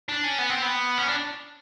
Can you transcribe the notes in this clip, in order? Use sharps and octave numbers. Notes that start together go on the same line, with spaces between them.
D4
C#4
B3
C4
B3
C#4
D4